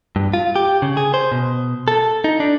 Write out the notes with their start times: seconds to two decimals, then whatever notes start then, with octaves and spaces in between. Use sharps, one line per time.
0.16 G2
0.34 F4
0.56 G4
0.82 C#3
0.97 G#4
1.14 C5
1.32 B2
1.88 A4
2.24 D#4
2.40 D4